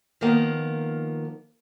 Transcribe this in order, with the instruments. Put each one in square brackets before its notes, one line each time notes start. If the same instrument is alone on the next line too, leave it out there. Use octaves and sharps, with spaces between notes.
[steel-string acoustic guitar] D#3 F3 A#3 B3